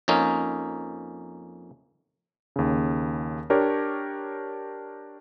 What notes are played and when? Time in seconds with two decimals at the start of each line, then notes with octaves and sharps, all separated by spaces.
0.08 F2 A#3 C#4 D#4
2.56 D#2 C#3
3.50 D4 G4 A#4 C#5